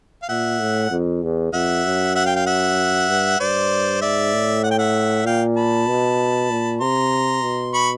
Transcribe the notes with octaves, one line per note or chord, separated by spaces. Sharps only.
F5
A#2 E5 F#5
A2
F2
E2
F2 E5 F#5
F#2
E5 F#5
F5 G5
F5 G5
E5 F#5
G2
G2 C5 D5
G#2 D5 E5
A2
F#5
G5
E5 F#5
A#2 F5 G5
A5 B5
B2
A#2
C3 A#5 C6
B2
B5 C#6